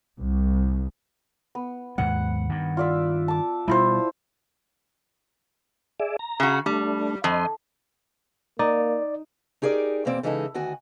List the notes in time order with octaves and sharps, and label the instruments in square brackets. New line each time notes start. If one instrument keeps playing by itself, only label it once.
[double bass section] C2
[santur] B3
[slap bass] D#2 G#2 G#3 [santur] F#5
[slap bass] G2 D#3
[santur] F4 D5 E5
A5 D6
[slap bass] B2 G3 [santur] E4 F4 C5
[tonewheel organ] G#4 D5 E5
A#5
[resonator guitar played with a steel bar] C#3 F#4
[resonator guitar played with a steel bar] G3 [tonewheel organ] A3 D4
[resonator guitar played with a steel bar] F2 [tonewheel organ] D#5 C6
[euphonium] A#3 [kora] D#4 [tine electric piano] D5
[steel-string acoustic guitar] D#4 G4 G#4 A#4 D5
E2 B2 A#3 C4 D5
C#3 E3 G#3 D#4 F#4 A4
D2 D#3 F#4 G#5